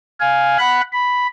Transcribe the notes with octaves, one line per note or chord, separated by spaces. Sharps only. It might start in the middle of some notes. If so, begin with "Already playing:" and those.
F5 G#5
F#5 B5 F#6
B5